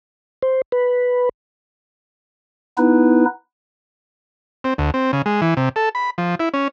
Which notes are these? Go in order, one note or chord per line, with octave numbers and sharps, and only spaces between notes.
C5
B4
B3 D#4 E4 B4
C4
D2
C4
C#3
G#3
E3
C3
A4
B5
F3
E4
C#4